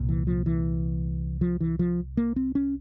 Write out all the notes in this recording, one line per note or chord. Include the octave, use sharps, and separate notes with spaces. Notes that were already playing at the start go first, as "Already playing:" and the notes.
Already playing: C2 A#2
E3
F3
E3
F3
E3
F3
A#3
C4
C#4